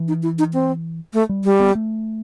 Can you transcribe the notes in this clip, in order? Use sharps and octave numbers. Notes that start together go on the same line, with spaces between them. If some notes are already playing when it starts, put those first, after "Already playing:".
Already playing: E3
D#4
E4
D#4
C4
A3
G3
G3
B3
A3